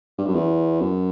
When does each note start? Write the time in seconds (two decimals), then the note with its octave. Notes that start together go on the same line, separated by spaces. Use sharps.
0.18 G2
0.26 F#2
0.35 E2
0.81 F#2